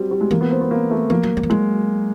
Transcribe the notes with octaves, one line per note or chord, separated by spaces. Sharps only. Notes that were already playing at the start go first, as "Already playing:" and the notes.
Already playing: F#3 G3 C4
G3
G#3
E3 A#3
B3
C4
B3
A#3
A3
F3 A#3
F#3
G3
F3
F#3 G#3